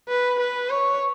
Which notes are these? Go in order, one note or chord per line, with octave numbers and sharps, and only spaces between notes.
B4
B4
C#5